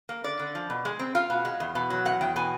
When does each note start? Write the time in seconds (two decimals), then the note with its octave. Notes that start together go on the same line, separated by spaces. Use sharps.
0.09 A#3
0.24 D3 D5
0.39 D3
0.55 F3
0.70 B2
0.85 G#3
0.99 C4
1.15 F4 F5
1.30 B2
1.45 G#3
1.60 E2
1.75 B2
1.90 F#3
2.05 E2 F#5
2.21 E2 G5
2.36 B2 G#5